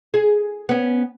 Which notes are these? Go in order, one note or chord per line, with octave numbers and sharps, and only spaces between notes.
G#4
B3 C#4